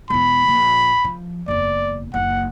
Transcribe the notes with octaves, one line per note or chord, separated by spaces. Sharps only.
E1 E3 B5
A#1
F3
F#1 E2 D5
F#1 D#2 F#5